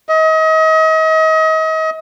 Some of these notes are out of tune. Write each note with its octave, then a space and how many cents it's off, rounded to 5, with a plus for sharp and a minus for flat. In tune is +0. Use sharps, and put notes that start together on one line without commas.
D#5 +35